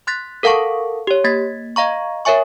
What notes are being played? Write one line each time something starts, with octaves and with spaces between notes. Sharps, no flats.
C6 F#6 A6 B6
A4 A#4 F5 F#5 A5 C#6
G4 C#5
A#3 G#6 A6 B6
D#5 F5 A#5 C#6
A#4 C#5 E5 G#5 C#6